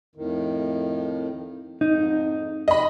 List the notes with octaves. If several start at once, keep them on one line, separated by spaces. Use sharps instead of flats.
F2 A2 D#3
F2 G#2 D#4
F3 G#3 D#5 B5